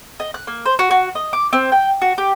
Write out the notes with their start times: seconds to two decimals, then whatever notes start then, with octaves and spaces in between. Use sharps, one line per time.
0.20 D#5
0.34 F#6
0.47 A#3
0.66 C5
0.79 F#4
0.91 F#4
1.15 D#5
1.33 D6
1.53 C4
1.72 G5
2.02 F#4
2.18 G4